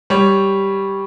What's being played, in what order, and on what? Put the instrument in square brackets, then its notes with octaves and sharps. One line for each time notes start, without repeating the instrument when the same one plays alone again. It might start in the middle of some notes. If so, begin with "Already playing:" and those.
[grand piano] G3 C#5